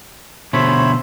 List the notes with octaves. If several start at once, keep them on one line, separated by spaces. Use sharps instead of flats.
B2 D3 C5 C#5 E5 B5